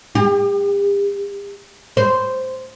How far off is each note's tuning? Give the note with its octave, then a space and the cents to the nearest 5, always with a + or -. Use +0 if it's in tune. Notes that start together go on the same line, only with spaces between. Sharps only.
G4 +40
C5 -10